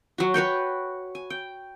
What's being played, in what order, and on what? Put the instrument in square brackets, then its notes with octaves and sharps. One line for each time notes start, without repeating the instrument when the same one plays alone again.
[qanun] F#3 F#4
F#4 B4 C#5 G5
G#5
G5